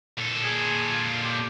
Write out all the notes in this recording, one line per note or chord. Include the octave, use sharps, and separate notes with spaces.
A#2 A4
G#4
F4
G4